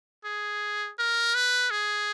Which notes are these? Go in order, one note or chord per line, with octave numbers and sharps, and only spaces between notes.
G#4
A#4
B4
G#4